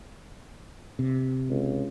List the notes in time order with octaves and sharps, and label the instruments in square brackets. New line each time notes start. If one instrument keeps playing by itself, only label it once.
[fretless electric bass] C3
[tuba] C#2